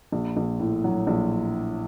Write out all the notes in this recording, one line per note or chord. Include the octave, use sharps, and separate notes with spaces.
A#1
A#1
A2
F#3
A#1